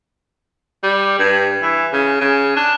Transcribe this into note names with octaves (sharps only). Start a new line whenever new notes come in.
G3
G2
E3
C#3
C#3
D4